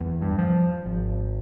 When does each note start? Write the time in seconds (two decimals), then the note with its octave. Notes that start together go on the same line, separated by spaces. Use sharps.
0.01 E2
0.21 G2
0.39 F3
0.86 G#1